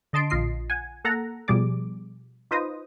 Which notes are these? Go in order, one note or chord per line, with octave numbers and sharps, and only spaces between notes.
D3 D#5 A5 C6 D7
A#1 F4 D#5 C7
F#5 G#5
A#3 A4 F#5 A#5
B2 F3 G3 G#4 D5 D6
D#4 F4 B4 C5 D#5 D#6